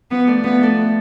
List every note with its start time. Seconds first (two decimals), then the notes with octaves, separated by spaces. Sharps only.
0.10 F3 B3
0.27 A3 D4 A4 D5
0.43 F3 B3
0.61 A3 D4 A4 D5
0.77 B3